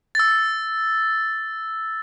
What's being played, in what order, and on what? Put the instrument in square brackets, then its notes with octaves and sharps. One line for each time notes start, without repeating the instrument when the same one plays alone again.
[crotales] E6 A6